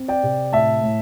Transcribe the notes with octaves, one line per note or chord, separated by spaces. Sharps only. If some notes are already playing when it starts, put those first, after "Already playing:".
Already playing: C4
D5 G5
C3
A2 E5 A5
A2